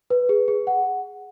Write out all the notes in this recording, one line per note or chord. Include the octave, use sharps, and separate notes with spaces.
B4
G#4
G#4
F#5